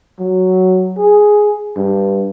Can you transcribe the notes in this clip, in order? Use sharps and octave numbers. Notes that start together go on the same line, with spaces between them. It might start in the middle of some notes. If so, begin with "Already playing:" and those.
F#3
G#4
G2